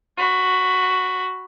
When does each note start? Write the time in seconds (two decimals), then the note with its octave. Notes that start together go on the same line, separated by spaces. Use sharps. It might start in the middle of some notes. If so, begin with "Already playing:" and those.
0.17 F#4 B5